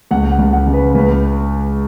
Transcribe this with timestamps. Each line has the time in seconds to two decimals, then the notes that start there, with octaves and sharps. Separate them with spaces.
0.11 C#2 F#5
0.32 F#5
0.39 C#2
0.53 F#5
0.67 C#3
0.74 B4
0.94 C#2 B4